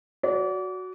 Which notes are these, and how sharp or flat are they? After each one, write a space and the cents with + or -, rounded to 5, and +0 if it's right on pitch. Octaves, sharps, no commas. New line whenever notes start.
F#4 +0 D5 -35